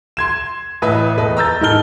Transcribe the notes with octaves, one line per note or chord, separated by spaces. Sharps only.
C6 G#6 E7
A1 B4 D#5 E5
E1 A3 B4 D#5
A#5 E6 G6 A6
G#2 D#3 D#4 A4 F6 G7